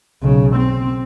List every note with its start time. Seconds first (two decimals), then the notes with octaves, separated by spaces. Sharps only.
0.22 B1 C#3
0.56 C4